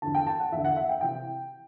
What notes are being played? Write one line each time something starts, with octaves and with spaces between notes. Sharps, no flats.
E2 D3 A5
G5
A5
F#5
E2 D3 E5
F#5
E5
G5
C3 E3 G5